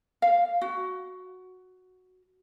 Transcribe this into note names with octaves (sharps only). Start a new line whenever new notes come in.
F5
F#4